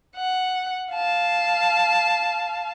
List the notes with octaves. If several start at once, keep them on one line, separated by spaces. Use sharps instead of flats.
F#5
F5 A5